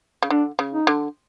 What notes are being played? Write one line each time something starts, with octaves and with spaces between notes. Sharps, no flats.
C#3
D3 D4
C#3
D#4
D3